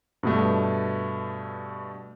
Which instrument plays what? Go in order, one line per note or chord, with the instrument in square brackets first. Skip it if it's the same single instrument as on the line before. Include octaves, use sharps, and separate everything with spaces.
[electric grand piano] G2 B2 A3